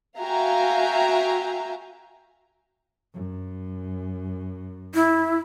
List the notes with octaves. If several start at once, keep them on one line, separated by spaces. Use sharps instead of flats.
F#4 E5 F5 G5 G#5 A#5
F#2
E4